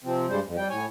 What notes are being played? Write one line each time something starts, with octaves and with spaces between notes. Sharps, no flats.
C3 F3 C4
G2 G3 G#3 C5
F2
G3 G5
A2 C#5 G#5